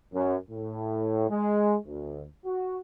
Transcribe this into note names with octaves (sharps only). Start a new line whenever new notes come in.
F#2
A2
G#3
D2
F#4